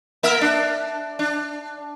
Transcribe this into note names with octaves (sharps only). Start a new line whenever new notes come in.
A#3 A#4 E5
D4
D4